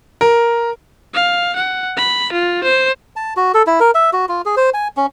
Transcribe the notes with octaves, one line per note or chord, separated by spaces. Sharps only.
A#4
F5
F#5
B5
F4
C5
A5
F#4
A4
E4
A#4
E5
F#4
F4
G#4
C5
G#5
C#4